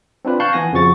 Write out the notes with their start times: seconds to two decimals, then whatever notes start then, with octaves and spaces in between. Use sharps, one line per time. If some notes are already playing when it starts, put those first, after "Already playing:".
0.25 C4 D4 F4 B4
0.40 F5 A5 C#6 F#6 G6 C7
0.53 E3 B3 G#5 A#6
0.72 F2 C#3 F3 F#4 C#6 A6